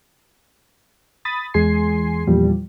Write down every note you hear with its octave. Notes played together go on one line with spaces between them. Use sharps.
B5 D#6 A6
E2 G#3 G#4 G#5 C6 C7
E2 A#2 F3 G3